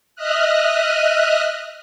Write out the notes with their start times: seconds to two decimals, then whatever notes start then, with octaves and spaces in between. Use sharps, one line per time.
0.15 D#5 E5 D#6 F6 F#6